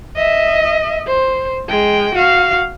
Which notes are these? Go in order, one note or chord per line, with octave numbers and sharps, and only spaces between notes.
D#5 E5
C5
G#3 G5
F#4 F5